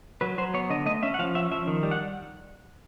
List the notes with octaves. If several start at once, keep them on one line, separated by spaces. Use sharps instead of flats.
F#3 B4
F#3 C5
B3 C#5
D3 D#5
A3 D#5
C#4 E5
F#5
F3 F5
C#4 E5
F3 E5
D#3
G3
F#5